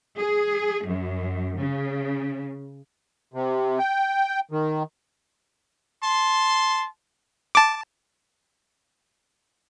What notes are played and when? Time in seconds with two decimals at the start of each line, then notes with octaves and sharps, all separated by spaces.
0.18 G#4
0.87 F#2
1.60 C#3
3.34 C3
3.79 G5
4.51 D#3
6.03 A5 C6
7.55 A5 D6